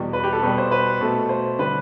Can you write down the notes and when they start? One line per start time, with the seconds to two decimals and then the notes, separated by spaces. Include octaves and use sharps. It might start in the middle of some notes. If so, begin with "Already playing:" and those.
Already playing: E2 B2 G3
0.13 B4
0.24 G4
0.32 A4
0.42 B2 G3 B4
0.58 C5
0.71 B4
1.01 B2 A3 A4
1.29 C5
1.58 D3 G3 B4